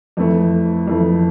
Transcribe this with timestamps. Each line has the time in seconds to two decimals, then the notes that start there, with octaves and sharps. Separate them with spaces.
0.17 F2 E3 A3
0.87 F2 E3 A3